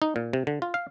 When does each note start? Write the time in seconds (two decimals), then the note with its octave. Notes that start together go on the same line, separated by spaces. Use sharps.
0.02 D#4
0.16 A#2
0.33 C3
0.47 D3
0.62 F4
0.74 F5